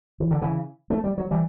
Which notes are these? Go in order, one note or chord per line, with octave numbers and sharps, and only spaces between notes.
E3
D3
C#3 E3
A3
G3
F#3
E3 G3